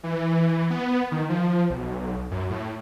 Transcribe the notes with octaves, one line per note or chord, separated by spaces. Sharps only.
E3
B3
D#3
F3
B1
F#2
A2